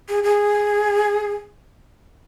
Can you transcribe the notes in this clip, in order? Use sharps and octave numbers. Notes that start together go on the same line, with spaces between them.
G#4
G#4